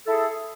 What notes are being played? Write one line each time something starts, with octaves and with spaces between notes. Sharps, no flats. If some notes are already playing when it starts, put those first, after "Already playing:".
E4 G#4 A4